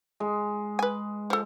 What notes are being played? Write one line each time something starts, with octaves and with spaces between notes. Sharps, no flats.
G#3
B4 G#5
F3 A4